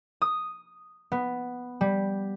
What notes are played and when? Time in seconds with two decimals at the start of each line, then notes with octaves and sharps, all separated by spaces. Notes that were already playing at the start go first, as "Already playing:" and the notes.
0.22 D#6
1.12 B3
1.81 G3